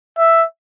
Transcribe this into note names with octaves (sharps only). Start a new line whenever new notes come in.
E5